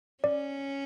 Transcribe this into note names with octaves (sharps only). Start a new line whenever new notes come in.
C#4 D5